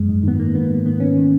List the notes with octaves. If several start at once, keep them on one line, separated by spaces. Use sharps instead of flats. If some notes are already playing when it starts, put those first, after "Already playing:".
Already playing: F#2 G#3
G#2
D#3 B3
D#3 A#3
D#3 B3
G#2
D#3 B3
D#3 C#4
D#3